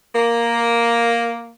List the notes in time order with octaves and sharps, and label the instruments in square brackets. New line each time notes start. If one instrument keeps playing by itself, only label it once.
[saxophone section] A#3